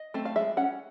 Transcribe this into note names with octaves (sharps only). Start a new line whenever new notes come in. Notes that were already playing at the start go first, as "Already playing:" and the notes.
Already playing: D#5
A3 C4
F5
G#3 E5
C#4 F#5